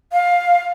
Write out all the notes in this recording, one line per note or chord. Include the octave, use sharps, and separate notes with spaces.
F5